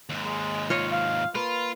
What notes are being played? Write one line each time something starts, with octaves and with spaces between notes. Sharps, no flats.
D#2 G#2
G#3
F4 C#5 D#5
F5
A#3 F4 B4